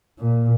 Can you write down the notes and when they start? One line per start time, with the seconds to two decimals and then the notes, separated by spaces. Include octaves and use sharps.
0.19 A#2